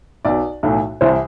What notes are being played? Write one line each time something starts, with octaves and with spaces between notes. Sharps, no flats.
B1 B2 D5
B1 A2 E3
C2 C3 E3 C5